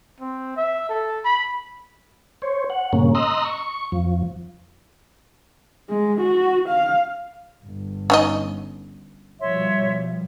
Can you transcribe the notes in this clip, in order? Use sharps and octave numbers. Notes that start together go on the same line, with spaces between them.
C4
E5
A4
B5
C5 C#5
F#5
G2 A#2 C#3 A#3 C#4
D#5 A#5 C6 D#6 E6 F#6
C#6
F2 F3
G#3
F#4
F5
G1
C#4 D#4 D#5
B2 F3 G3 C#5 E5 C6